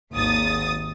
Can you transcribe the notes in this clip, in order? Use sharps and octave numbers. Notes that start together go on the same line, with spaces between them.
G#1 D#2 D#6 A6